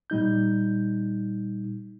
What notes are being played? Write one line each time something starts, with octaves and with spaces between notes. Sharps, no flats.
A#2 G3 D#4 G6